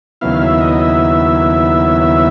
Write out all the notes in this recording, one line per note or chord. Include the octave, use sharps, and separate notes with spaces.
D#2 C#3 F#3 B3 E4 F5
E5
D#5
E5
E5